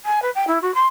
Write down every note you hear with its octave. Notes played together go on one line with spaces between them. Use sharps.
G#5
B4
G5
E4
F#4
C6